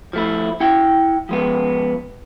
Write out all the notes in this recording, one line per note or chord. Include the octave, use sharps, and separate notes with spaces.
F3 A3 E4
E4 F#5 G5
F3 G#3 B3